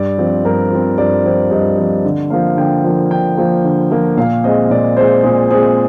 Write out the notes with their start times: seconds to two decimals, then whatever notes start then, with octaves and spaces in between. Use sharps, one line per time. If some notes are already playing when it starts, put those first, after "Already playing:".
Already playing: G2 D5
0.18 F3 C4
0.45 G2 A#4
0.71 F3 C4
0.98 G2 D5
1.24 F3 C4
1.50 G2 D#5
1.78 F3 C4
2.05 D3
2.30 F3 A#3 F5
2.57 D3 G5
2.84 F3 A#3
3.11 D3 G5
3.38 F3 A#3
3.65 D3
3.91 F3 A#3
4.17 A#2 F5
4.44 G#3 C4 D#5
4.70 A#2 D5
4.97 G#3 C4 C5
5.23 A#2 G#4
5.51 G#3 C4 G#4